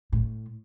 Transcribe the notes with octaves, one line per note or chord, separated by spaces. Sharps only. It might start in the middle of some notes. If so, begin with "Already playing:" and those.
A2